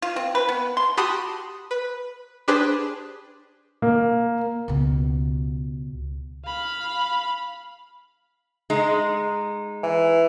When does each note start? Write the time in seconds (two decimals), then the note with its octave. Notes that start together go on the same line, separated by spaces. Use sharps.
0.02 F4
0.16 C4
0.35 B4
0.49 B3
0.77 C6
0.97 F#4 G4 A5 B5 C6 D#6
1.71 B4
2.48 D4 G4 G#4 B4 C5
3.82 A#3
4.68 C#2 B2
6.45 F5 B5
8.70 G#3 D#4
9.83 E3